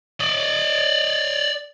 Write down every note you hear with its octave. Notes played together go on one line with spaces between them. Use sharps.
D5 D#5